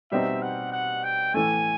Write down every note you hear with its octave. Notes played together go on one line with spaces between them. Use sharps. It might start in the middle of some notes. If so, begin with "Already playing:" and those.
B2 G3 C4 D#4 E5
F#5
F#5
G5
A2 E3 A3 G#5